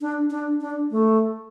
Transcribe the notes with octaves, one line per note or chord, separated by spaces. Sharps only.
D4
D4
D4
A3